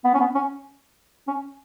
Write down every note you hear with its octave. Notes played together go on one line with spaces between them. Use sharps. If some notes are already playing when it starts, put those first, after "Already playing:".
B3
C#4
B3
C#4
C#4